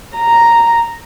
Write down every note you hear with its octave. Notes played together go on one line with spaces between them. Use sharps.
A#5